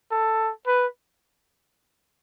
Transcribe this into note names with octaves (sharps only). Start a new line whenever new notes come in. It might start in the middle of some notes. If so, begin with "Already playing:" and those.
A4
B4